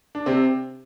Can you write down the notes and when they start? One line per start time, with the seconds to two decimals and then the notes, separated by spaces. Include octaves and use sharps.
0.15 D4
0.26 C3 C4